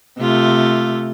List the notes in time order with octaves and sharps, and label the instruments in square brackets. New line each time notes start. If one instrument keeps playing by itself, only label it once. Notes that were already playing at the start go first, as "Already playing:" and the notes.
[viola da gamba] C3 A3 F4